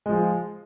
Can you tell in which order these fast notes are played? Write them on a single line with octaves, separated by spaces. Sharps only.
G#3 F3 F4